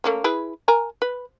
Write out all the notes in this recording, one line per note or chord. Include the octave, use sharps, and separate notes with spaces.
A3 A#3 C#4
E4 G#4 B4
A#4 G#5 A#5
B4